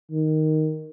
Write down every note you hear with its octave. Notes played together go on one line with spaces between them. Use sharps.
D#3